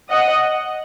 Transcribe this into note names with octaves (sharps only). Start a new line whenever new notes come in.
D#5 F#5